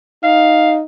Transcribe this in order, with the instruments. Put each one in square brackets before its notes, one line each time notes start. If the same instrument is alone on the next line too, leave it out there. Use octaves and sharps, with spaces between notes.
[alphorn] D#4 [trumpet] F5